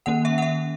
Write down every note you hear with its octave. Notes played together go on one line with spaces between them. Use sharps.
D#3 A#3 C#4 F#5
E5
F#5
E5